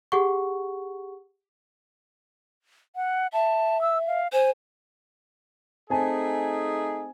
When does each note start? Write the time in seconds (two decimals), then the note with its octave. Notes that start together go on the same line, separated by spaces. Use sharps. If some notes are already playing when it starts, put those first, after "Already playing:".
0.12 G4 G#4 F#5 C#6
2.96 F#5
3.33 E5 A5
3.81 E6
4.07 F5
4.33 C5 G#5
5.90 A3 C4 D#4 G#4 G#5 A5